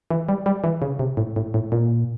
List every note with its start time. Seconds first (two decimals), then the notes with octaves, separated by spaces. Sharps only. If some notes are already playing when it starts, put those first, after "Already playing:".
0.11 E3
0.29 G3
0.46 G3
0.64 E3
0.82 C#3
0.99 C3
1.17 A2
1.36 A2
1.54 A2
1.72 A#2